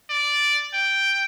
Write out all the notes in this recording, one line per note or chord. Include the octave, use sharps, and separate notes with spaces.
D5
G5